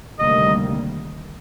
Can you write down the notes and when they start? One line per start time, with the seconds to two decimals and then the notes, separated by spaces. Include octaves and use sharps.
0.19 D2 C3 D#3 G3 A#3 D#5